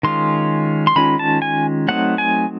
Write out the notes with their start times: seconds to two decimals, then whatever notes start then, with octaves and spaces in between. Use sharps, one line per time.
0.03 D#3 G#3 C#4 F4 C6
0.87 C6
0.96 D#3 G#3 C#4 F4 B5
1.19 A5
1.42 G#5
1.88 F#3 A3 C4 D#4 F#5
2.18 G#5